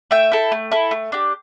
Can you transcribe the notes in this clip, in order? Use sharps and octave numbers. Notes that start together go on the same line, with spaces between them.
A3 E5 G5
E4 A4
A3
E4 A4
A3
D4 G4